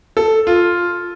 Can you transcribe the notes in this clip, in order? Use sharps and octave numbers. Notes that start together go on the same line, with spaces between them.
A4
F4